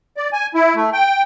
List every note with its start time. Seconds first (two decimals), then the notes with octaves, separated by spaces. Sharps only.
0.17 D5
0.33 G#5
0.55 E4
0.75 A3
0.93 G5